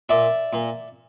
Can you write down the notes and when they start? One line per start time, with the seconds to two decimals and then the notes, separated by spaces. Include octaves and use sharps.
0.09 A#2 D5 E5
0.53 A#2